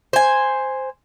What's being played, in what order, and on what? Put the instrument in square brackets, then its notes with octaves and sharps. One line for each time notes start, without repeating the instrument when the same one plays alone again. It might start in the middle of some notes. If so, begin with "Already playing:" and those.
[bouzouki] C5 G#5